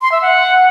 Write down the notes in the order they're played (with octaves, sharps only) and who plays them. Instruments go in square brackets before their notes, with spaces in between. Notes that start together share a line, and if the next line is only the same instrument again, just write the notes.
[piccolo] C6
E5
F#5